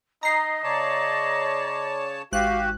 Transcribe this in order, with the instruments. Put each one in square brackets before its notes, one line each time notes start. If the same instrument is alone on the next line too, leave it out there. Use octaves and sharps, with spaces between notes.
[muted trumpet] D#4 [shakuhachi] D#5 [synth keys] A#5 C7
[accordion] C#3 C#5 A5 [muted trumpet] D5
[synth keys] G#1 F#6 [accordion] F#4 G4 [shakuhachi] F5